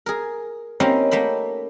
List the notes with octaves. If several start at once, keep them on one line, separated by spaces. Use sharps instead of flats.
G#4 A#4
A#3 C4 C#4 D#4 E4 G4
A3 A#3 G5 B5